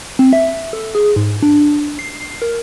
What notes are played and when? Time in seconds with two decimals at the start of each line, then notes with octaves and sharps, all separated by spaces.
0.19 C4
0.33 E5
0.73 A4
0.95 G#4
1.16 G#2
1.43 D4
1.99 C7
2.42 A#4